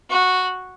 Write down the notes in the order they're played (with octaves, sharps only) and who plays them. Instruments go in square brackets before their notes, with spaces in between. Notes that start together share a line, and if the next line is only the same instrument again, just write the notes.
[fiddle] F#4